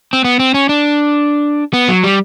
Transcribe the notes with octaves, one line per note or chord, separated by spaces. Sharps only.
C4
B3
C4
C#4
D4
B3
F#3
G3